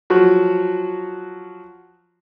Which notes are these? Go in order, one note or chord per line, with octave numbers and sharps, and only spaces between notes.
F3 F#3 F#4